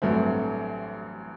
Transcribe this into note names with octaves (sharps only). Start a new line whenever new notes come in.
A1 G2 F#3 A3 C4